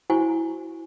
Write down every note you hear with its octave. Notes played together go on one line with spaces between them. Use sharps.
E4 F#4 C5 G#5 C#6